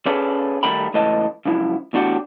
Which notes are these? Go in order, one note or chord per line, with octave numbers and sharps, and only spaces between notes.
C#4 G#4 A4 B4 D5
D#3 G3 A3 A#4 G5 B5
C#2 A2 E3 D#5 A5
C#2 F#2 F3 E4
E2 A2 D4 F#4 G4